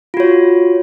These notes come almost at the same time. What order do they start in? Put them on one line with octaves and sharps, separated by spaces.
F4 F#4 C#5